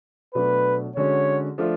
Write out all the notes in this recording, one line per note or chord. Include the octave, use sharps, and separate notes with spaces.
B2 F#3 A3 D4 B4
D3 G#3 C#4 F#4 C#5
F3 A3 D4 F4